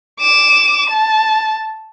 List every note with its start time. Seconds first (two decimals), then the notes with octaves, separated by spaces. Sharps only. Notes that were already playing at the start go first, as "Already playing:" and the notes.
0.19 D6 E7
0.90 A5